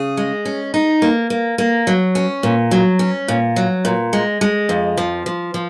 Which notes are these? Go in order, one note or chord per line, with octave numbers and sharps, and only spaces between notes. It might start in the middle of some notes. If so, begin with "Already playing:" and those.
Already playing: C#3 G#4
G#3
C#4
D#4
A#3
A#3
A#3
F#3
C#4
A#2
F#3
C#4
A#2
F#3
A#2
G#3
G#3
F2
F3
F3
F3